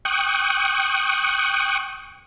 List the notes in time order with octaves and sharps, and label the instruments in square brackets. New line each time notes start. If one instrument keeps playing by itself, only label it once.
[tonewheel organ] G5 C#6 D#6 F#6